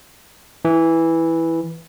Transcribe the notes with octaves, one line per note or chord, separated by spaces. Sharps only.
E3